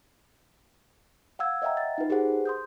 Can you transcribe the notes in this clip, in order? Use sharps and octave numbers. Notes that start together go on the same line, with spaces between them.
F5 F#5 E6 G#6
C#5 D#5 E5 F#5 G5 A#5
A6
D#4 F4 B4
G4 G#4 A#4 C5 F#5
C6 D#6 G6